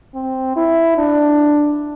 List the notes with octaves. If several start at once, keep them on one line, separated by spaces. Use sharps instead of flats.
C4
E4
D4